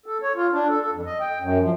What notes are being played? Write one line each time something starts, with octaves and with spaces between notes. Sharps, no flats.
A4
C#5
F4
D4
A4
A4
F2
D#5
G5
F#2
F3